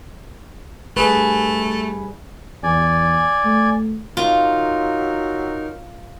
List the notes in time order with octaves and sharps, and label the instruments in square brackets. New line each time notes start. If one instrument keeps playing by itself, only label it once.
[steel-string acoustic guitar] G2 G#4 B4 [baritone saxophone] A3
[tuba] E2 [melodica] D5 G#5
[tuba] A3
[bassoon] F#3 [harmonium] D#4 A#4 [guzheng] F4